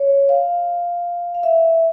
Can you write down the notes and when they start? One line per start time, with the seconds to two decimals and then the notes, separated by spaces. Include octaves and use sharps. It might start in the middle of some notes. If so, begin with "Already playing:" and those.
Already playing: C#5
0.29 F5
1.35 F5
1.43 E5